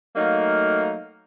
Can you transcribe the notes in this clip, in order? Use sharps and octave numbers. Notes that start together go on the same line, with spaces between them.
F#3 A3 A#3 D#4 F5